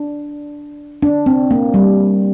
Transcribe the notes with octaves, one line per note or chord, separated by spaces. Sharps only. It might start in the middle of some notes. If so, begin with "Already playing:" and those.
Already playing: D4
D4
C4
A#3
G3